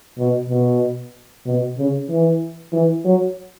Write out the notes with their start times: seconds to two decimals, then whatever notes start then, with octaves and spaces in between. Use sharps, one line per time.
0.18 B2
0.49 B2
1.46 B2
1.77 C#3
2.09 E3
2.73 E3
3.05 F#3